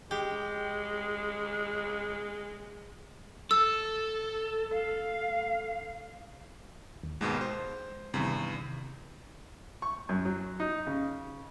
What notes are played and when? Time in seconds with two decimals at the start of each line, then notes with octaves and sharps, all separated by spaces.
0.11 G#3 G4
3.51 A4 E6
4.73 F5
7.03 D#2
7.21 D#2 G#2 B2 G#3
7.41 C5
8.14 E2 G2 C3 D#3
9.82 C#6
10.09 F#2
10.25 F#3
10.60 D#4
10.87 C#3